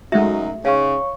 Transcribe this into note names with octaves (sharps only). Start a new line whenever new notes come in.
F#2 C#3 G#3 A3 D#4 F#4 E5
G#2 C#3 C#5 F5 C#6